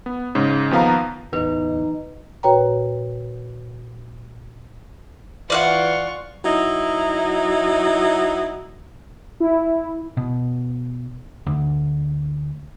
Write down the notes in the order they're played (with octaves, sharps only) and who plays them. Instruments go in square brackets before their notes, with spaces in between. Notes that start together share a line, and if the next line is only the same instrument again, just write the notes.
[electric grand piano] B3
G#2 C#3
D#2 F3 B3 F5 A#5
[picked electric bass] D1 E2 [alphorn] D#4 [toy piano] B4
[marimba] A#2 F#4 B4 C#5 G5 A#5
[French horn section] E3 [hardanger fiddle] F4 C#6 [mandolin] D5 F5 F#5
[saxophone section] F#3 D#4 E4
[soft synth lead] E4
[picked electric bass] B2
D2